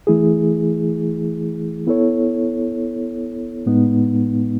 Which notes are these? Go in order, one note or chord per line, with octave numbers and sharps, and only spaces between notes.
E3 A3 E4 G#4
B3 E4 A4 C#5
A2 G#3 B3 D#4